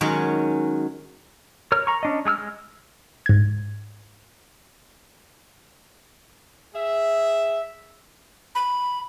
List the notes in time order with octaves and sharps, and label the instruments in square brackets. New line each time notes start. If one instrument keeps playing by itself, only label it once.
[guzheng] D#3 F#3 G#3 C#4
[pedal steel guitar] A#4 C#5 F6
A#5 C#6
C#4 D4 D#5
G#3 G#4 E6 F6
G#3
[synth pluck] G#2 G#6
[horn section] G#4 E5
[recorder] B5